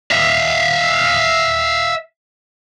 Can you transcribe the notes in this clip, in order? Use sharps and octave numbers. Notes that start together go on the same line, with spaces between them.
E5 F5